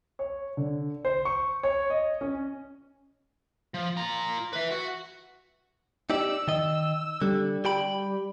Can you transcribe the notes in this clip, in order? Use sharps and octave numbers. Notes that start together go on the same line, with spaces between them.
C#5
D3
C5
C#6
C#5
D#5
C#4
F3
F4 A#5
B4 E5
F#4
D#4 G4 D5 E6
D#3 D#5
D3 G3
G4 G5 B5